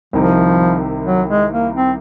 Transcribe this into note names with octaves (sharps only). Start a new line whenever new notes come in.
C2 C3 D#3 F3
F#3
G#3
A#3
C4